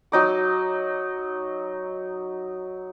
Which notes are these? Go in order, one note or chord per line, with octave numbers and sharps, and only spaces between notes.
F#3 D#4 D6